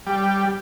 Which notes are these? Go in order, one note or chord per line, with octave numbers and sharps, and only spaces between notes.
G3